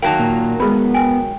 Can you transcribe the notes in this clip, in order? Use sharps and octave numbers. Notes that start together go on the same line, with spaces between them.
D#3 F#3 A#3 G5 A5
A#2
G#3 B3 G#4 B5
G5 G#5